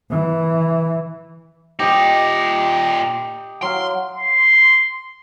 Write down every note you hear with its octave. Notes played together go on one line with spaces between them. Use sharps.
E3
A#2 D#4 G4 D#5
F#3 F5 C6
C6